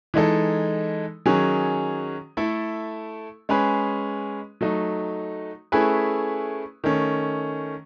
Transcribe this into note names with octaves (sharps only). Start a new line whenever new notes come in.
E3 G#3 D#4 A4
D#3 F#3 C#4 G#4
A3 E4 A4
G#3 C#4 G#4 B4
F#3 A3 D#4
A3 C#4 E4 G#4 B4
D#3 A3 C#4